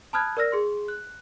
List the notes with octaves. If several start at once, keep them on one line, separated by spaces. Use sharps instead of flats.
A5 B5 D#6 F6 F#6 G#6
A#4 D5 E6 F6 A#6
G#4 C6
F#6